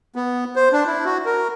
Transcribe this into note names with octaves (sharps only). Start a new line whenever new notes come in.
B3
C5
D4
E4
F#4
A#4